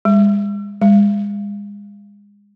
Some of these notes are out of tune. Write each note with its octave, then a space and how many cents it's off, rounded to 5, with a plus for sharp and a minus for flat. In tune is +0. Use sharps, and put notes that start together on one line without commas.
G#3 -40
G#3 -30